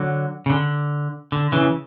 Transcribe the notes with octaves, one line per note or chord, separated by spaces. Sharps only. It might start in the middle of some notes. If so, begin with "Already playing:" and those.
Already playing: D3 F#3
C#3
D3
D3
C#3 E3